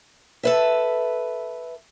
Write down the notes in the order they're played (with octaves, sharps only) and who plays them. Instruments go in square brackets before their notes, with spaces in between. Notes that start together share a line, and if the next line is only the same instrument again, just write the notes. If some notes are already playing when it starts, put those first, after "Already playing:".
[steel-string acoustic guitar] A4 B4 E5